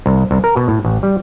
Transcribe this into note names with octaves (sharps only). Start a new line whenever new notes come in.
C2
C2
A#4
B2
A2
A1
G3